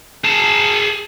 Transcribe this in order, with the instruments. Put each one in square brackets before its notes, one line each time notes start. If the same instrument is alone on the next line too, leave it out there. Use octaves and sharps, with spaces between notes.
[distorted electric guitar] G#4 A5